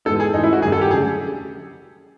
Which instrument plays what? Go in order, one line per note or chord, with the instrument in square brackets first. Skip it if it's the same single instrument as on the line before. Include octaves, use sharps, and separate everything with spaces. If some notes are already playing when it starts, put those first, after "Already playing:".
[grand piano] G#2 E3 G#3 B3 D#4 [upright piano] A4
[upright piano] G#4
[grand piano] G#2 E3 A3 C#4 F4 [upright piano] D#4
[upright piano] E4
F#4
[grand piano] G2 D#3 G3 A#3 C#4 [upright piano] G#4
[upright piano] A4
G4
[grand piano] D3 F#3 A3 C#4 [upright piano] G#4